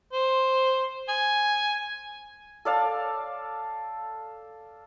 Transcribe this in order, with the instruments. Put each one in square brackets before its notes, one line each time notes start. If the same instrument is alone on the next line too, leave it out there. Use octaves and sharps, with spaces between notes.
[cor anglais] C5
G#5
[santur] A4 D5 F5 A5